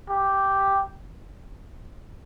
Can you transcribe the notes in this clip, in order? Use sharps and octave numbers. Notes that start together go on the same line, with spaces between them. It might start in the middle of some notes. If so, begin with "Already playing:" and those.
G4